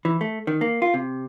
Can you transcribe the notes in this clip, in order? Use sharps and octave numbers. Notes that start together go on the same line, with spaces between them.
E3
A3
D#3
A#3
F4
C3